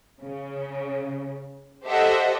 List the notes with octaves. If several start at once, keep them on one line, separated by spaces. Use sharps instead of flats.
C#3
G4 A4 C5 D#5 E5 F#5